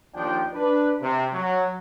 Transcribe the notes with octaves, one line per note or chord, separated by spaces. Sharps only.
D#2 F3 D4 G5
D4 B4
C3
F#3